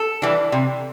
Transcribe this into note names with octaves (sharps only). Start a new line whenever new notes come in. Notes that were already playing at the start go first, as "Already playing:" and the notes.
Already playing: A4
E3 G3 D4
C3